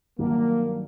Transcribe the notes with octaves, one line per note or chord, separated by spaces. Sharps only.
G2 D#3 F#3 A#3